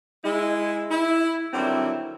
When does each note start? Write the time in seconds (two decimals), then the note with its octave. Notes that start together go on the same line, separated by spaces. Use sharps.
0.25 G#3 E4
0.91 E4
1.54 D3 D#3 F#3 G3 C4 E4